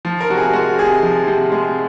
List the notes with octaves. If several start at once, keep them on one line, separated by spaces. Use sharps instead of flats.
F3
A#4
C3 F#4
G#4
G#3 F#4
C3 G#4
F3
C3
G#3